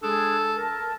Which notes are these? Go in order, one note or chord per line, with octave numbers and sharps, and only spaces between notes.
G#3 D4 G#4 A4
A#4 A5